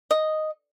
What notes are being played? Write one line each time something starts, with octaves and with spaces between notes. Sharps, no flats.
D#5